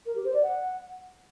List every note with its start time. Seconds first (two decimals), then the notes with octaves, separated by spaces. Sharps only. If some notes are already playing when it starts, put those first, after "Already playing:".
0.06 A#4
0.15 G4
0.25 C5
0.34 D5
0.43 F#5